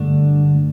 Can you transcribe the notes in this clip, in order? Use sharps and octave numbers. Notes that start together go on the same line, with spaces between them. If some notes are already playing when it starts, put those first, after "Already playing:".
Already playing: G2 D3 A3 D4